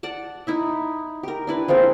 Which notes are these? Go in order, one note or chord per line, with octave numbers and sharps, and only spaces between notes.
D5 F#5 A5
D#4 E4 E5
G4 A#4
D4 E4 B4
F3 G#3 A#3 C4